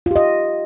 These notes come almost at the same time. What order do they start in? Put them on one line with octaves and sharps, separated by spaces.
F4 G4 D#5